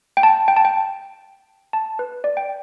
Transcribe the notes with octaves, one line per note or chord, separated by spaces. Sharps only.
G5
A5
G5
A5
G5
A5
B4
D5
G5